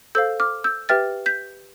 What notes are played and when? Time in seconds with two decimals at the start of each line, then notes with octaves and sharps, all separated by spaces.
0.15 A4 C5 F5 E6 G6
0.40 D6 F6
0.64 E6 G6
0.89 G4 B4 E5 G5 F6 A6
1.26 G6 B6